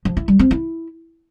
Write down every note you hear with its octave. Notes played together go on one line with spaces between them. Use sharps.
F3
E4
G3
C4
E4